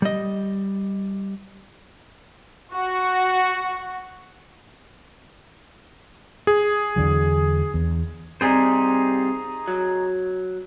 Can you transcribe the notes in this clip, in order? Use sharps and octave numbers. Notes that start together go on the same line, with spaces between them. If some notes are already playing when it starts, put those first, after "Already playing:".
G3 D#5
F#4
G#4
E2 D3 F#3
E2
C3 G3 D#4 G#4 C5
F#3